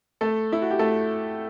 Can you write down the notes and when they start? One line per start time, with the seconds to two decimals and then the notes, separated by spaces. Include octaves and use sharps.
0.21 A3 A4
0.52 E4
0.62 F#4
0.70 G4
0.79 A3 A4